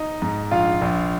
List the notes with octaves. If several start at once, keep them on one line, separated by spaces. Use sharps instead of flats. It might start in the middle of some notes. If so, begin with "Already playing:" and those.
Already playing: D#4
G#2
A#1 F4 F5
A#1